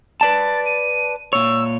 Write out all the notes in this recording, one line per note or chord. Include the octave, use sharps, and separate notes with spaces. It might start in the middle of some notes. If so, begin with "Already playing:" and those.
B4 D5 A5 A6
D#7
A#2 C#5 E6